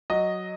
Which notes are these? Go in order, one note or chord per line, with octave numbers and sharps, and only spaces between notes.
F#3 D#5